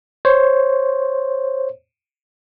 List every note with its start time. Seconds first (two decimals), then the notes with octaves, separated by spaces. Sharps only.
0.25 C5 C#5